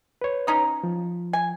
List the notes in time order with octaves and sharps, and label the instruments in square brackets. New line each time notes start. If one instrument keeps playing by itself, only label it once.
[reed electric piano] B4 C#5
[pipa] C#4 D#4 D#5
[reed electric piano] F3
[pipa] G#5